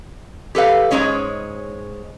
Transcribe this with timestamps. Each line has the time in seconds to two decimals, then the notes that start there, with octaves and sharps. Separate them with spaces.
0.55 G4 A4 B4 F5
0.91 G#2 D3 G#3 C#4 C#5